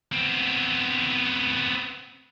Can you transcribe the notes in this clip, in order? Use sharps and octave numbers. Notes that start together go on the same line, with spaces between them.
B3 C4